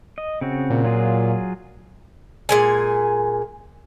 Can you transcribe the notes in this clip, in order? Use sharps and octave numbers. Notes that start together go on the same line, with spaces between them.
D#5
C#3 C4 F#4
A#2
F#3 F4 G#4
A#2 G#3 G#5